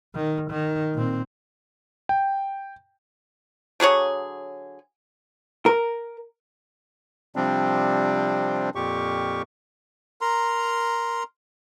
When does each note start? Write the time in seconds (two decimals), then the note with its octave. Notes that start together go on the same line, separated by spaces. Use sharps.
0.15 D#3
0.50 D#3
0.94 A#2 C4
2.09 G5
3.80 D3 F#3 G#4 C#5
5.66 A#4
7.36 C3 F3 G3 C4 D4
8.75 F2 A#2 G4 C#6
10.21 A#4 A#5 C6